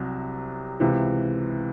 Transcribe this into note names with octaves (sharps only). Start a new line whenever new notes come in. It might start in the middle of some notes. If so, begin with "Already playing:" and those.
Already playing: C2 C3 F#3
C#2 C3 E3